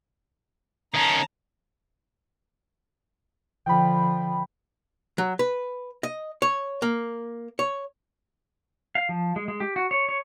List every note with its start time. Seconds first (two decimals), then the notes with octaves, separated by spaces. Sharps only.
0.94 D#3 C#4 A5 A#5
3.66 D3 F3 G5 B5
5.18 F#3
5.39 B4
6.03 D#5
6.42 C#5
6.82 A#3
7.59 C#5
8.95 F5
9.09 F3
9.36 G#3
9.48 G#3
9.60 G4
9.76 F#4
9.91 C#5
10.09 C#5